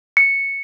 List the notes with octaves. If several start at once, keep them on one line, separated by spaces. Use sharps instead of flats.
C#7